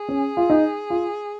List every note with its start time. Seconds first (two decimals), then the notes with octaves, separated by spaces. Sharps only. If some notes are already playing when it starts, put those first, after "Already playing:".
Already playing: G#4
0.09 C#4
0.37 F4
0.50 D#4
0.90 F4